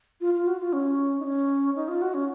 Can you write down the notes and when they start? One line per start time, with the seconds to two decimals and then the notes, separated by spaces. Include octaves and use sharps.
0.21 F4
0.34 F4
0.47 F#4
0.60 F4
0.73 C#4
1.20 D#4
1.24 C#4
1.76 D#4
1.88 F4
2.02 F#4
2.14 C#4